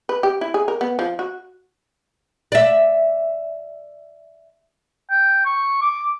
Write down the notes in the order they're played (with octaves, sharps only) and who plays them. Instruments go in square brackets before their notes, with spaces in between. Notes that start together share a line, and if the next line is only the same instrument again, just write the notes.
[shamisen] B4
G4
E4
G#4
A#4
B3
F3
F#4
[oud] D5 E5
[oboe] G5
C#6
D6